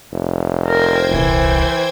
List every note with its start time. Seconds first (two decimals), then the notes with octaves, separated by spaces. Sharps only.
0.13 F1
0.67 A#4 C5 G5 G#6
1.11 D#1 C2 E3